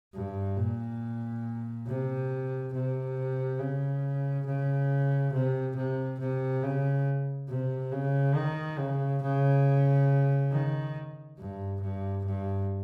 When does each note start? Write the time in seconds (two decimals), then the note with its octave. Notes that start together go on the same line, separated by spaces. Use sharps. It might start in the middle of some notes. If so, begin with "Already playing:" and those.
0.14 G2
0.57 A#2
1.87 C3
2.73 C3
3.59 C#3
4.46 C#3
5.33 C3
5.76 C3
6.19 C3
6.63 C#3
7.49 C3
7.92 C#3
8.36 D#3
8.78 C#3
9.22 C#3
10.52 D#3
11.38 G2
11.81 G2
12.25 G2